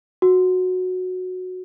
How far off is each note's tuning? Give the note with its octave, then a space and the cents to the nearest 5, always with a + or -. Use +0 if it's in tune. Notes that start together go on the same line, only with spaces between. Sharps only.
F#4 -10